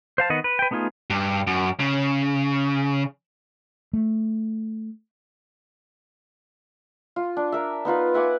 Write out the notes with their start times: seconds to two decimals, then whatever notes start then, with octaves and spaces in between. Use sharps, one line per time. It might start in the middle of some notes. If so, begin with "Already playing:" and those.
0.18 C5 F5 A5
0.30 D#3 B3 D#5 F#5
0.44 B4
0.59 B4 G5
0.71 A3 B3 D#4 F4 G#4
1.10 G2
1.47 F#2
1.80 C#3
3.93 A3
7.16 F4
7.37 D4
7.52 A#4 E5
7.85 B3 D#4 F4 B4
8.14 E5 F#5 G#5 D6